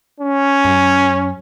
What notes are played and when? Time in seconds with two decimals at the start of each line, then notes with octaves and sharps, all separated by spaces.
0.20 C#4
0.64 F#2